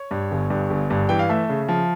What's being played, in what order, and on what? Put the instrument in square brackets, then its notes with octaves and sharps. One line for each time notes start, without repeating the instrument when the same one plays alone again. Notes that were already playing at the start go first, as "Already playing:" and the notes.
Already playing: [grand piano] C#5
G2
G1
G2
G1
G2
E3 G5
F5
A3 E5
C#3
F3